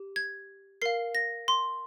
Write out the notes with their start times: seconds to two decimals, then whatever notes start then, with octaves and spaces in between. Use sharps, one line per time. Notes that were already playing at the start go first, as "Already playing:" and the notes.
Already playing: G4
0.16 G#6
0.82 A#4 F5 C7
1.15 A#6
1.48 C6